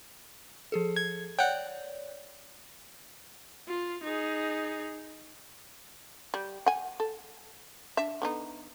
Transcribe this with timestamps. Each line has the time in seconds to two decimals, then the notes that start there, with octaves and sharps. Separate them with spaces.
0.72 F3 G#4 A4
0.96 G#6
1.39 C#5 D5 F#5 G5
3.68 F4
4.03 D#4 G#4
6.34 G3
6.66 F#5 G#5
7.00 A4
7.97 D4 E5
8.22 D3 B3 D#4